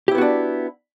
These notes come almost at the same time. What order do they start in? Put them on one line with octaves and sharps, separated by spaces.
G4 E4 B3 F#4 D4